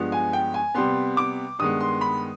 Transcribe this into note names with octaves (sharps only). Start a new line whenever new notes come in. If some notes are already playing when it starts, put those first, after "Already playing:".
Already playing: G2 F3 G#3 B3
G#5
G5
G#5
C3 G3 B3 C6
D6
G2 D#3 G#3 B3 D#6
C6
B5